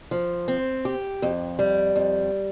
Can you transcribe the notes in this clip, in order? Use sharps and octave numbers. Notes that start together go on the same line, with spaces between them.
F3
C4
G4
F2
G3
F2